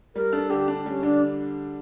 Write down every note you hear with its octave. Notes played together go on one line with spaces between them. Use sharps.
G3 A#4
D4 A4
D3 G4
D4
G3 C#4
D3 D4